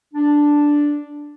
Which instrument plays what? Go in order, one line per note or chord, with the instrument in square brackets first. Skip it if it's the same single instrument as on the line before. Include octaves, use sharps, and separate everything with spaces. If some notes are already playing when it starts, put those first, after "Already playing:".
[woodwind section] D4